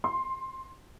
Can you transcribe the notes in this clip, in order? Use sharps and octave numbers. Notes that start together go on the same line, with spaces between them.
C6